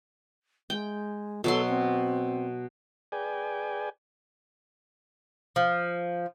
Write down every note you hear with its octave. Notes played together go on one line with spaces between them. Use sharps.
G#3 G5
B2 F#3 A4 C6
C4
G#4 B4 D5 G5 G#5
F3